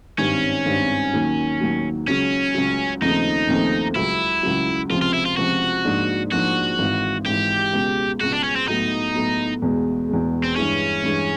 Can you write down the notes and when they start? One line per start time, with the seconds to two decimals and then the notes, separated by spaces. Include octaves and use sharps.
0.18 G#1 G2 D#3 G3 C4 C#4
0.66 G#1 G2 D#3 G3 C4
1.13 D#2 D#3 F#3 A#3
1.60 D#2 D#3 F#3 A#3
2.07 C#2 C#3 F#3 C#4
2.54 C#2 C#3 F#3
3.02 D#2 C#3 F3 A3 C4 D#4
3.49 D#2 C#3 F3 A3 C4
3.96 C#2 C#3 F#3 E4
4.43 C#2 C#3 F#3
4.90 C#2 C3 F3 F4
5.02 F4
5.14 E4
5.25 F4
5.37 C#2 C3 F3 F#4
5.85 G#2 F3 A#3 D4
6.32 G#2 F3 A#3 D4 F#4
6.79 G#1 G#2 E3
7.26 G#1 G#2 E3 G4
7.73 C#2 B2 G#3
8.20 C#2 B2 G#3 F#4
8.33 D4
8.43 C#4
8.56 C4
8.68 A2 F#3 B3 D#4
9.14 A2 F#3 B3
9.62 E2 B2 G#3
10.09 E2 B2 G#3
10.44 C4
10.56 G2 E3 G#3 C#4
11.03 G2 E3 G#3